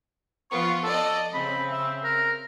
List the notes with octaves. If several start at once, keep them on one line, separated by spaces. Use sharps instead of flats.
F3 B3 F4 C#6
A4 D5 D#5
C#3 C4 B5
E5
A#4